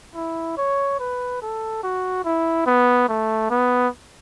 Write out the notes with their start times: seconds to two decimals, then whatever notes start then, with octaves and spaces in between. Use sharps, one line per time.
0.15 E4
0.57 C#5
1.00 B4
1.42 A4
1.83 F#4
2.25 E4
2.66 B3
3.09 A3
3.51 B3